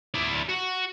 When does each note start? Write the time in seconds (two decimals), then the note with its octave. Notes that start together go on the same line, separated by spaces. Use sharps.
0.14 E4 D5
0.49 F#4